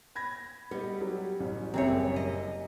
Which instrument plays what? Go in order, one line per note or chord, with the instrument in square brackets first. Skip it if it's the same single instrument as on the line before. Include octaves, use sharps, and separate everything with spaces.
[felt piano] B5 G#6 A#6
[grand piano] G3 D#5 [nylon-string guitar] B3
[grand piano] F#3 G3
[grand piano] A1 [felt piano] C#4
[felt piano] F#1 F#2 G3 [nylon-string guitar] C4 G#4 C#5 [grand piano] E5 A#5
[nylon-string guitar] D#5